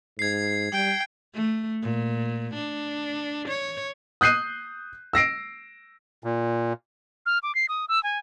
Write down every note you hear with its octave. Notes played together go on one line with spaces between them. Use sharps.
G#2 G#6 C7
G3 G5
A3
A#2
D4
C#5
D#6 F#6 G6 C7 D#7
E6 A#6 C7 D7
A#2
F6
D6
C7
D#6
E6
G#5